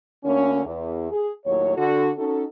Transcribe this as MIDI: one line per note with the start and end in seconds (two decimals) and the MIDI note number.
0.23 0.61 38
0.23 0.61 50
0.23 0.61 58
0.23 0.61 61
0.65 1.07 40
1.10 1.31 68
1.45 1.75 39
1.45 1.75 45
1.45 1.75 54
1.45 1.75 73
1.76 2.09 50
1.76 2.09 66
1.76 2.09 69
2.17 2.44 61
2.17 2.44 63
2.17 2.44 66
2.17 2.44 69